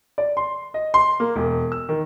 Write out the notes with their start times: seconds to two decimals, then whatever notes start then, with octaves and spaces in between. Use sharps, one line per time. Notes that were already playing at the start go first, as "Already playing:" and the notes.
0.18 D5
0.37 C6
0.74 D#5
0.94 C6
1.20 A#3
1.36 E1
1.72 E6
1.89 D#3